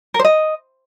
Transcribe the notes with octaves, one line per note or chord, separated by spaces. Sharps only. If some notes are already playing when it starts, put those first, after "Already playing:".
A#4
C5
D#5